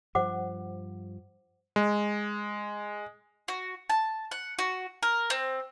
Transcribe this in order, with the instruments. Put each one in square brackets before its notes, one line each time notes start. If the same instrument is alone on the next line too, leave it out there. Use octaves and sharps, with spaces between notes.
[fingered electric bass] G2 F3 [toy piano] C5 F#5 D6
[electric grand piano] G#3
[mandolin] F#4
A5
F#5
F#4
A#4
C4